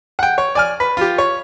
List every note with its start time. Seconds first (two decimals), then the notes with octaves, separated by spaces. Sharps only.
0.19 F#5 G5
0.38 C#5
0.55 D5 G#5 F6
0.80 B4
0.97 F4 G4
1.18 C#5